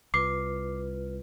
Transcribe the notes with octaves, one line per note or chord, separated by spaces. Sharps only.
C2 F4 B4 D6 C7